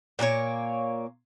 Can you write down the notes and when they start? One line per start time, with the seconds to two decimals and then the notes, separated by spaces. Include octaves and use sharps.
0.19 A#2 A#3 D#4 C#5